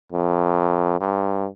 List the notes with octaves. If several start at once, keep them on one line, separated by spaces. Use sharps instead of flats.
F2
G2